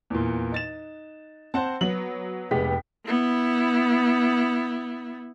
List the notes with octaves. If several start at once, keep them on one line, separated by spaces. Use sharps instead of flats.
E2 A#2
D#4 A6 E7
C4 C5 F#5 A5
F#3 B3 F#7
F1 G#3 B3 G4 B6
B3 E4